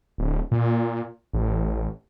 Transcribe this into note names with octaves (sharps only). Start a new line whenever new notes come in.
D1
A#2
A1